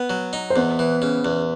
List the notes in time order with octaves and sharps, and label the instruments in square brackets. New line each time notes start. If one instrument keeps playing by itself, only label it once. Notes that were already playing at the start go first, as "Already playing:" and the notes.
Already playing: [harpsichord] B3
F#3
D#4
[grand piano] C5
[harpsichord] E2 [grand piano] B3 B4
[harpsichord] E3
C#3
E2